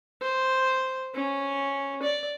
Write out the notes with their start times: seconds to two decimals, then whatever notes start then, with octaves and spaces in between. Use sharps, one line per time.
0.22 C5
1.15 C#4
2.03 D5